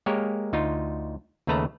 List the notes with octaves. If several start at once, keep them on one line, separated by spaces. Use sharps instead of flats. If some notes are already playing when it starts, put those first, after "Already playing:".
G#3 A#3 G4 A#4 C#5
D2 D#4 F4
D#2 C#3 A3 B4 A5 A#5